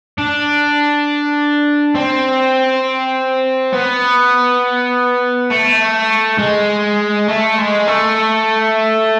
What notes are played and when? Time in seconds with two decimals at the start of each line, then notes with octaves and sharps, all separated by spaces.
0.18 D4
1.95 C4
3.73 B3
5.50 A3
6.39 G#3
7.28 A3
7.58 G#3
7.87 A3